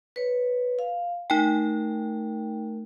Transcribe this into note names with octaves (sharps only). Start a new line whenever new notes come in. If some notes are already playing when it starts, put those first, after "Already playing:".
B4 C#5
F5
A3 D#4 A#4 G5